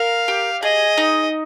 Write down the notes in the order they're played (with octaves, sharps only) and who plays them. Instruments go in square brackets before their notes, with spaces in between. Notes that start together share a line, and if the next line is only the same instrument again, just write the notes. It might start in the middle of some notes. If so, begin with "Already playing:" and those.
Already playing: [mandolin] A#4 [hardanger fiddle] F5
[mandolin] G4
[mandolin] G#4 [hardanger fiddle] D#5
[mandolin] D#4